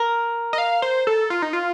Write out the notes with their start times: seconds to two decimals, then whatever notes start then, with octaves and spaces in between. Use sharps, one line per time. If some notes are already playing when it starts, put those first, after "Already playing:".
Already playing: A#4
0.53 D#5
0.58 F5
0.82 C5
1.07 A4
1.30 F4
1.42 D#4
1.53 F4